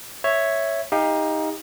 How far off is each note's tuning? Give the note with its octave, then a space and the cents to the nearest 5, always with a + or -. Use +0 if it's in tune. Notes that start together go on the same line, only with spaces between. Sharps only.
C#5 +0 E5 +0
D#4 +15 G4 +30 F5 +0